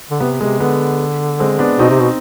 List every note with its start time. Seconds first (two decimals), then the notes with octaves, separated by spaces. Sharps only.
0.11 D3
0.20 C3 B3
0.41 C3 G#3
0.60 D3 B3
1.40 G#3 C4
1.59 B3 D4
1.79 B2 C4 D#4
1.90 C3
2.00 B2